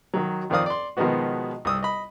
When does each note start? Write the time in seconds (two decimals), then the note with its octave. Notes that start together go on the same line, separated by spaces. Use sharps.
0.14 D#3 F#3
0.50 F2 D#3 C4 D5 F5 D#6
0.66 D5 C6
0.97 B2 D#3 F3 G#3 B3 F#4
1.65 C2 D#6 E6
1.83 D#5 B5